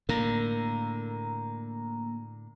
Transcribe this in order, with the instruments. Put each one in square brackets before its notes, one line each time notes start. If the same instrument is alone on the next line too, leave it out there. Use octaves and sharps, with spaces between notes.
[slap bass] A2 D3 [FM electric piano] A#3 A#5